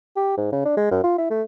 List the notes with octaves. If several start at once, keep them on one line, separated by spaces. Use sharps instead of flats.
G4
G#2
C#3
D4
G#3
F#2
F4
E4
A3